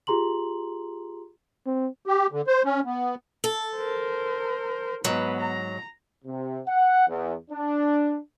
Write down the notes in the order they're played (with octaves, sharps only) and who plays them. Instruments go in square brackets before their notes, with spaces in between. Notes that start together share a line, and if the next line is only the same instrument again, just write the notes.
[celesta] F4 G4 G#4 A#5 C6 F#7
[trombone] C4
[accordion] G4
D3
C5
C#4
B3
[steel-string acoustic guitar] A4
[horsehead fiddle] A#4 C5
[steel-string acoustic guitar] G#2 F#3 [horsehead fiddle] B3 B4
[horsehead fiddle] A#5
[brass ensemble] C3
F#5
E2
D4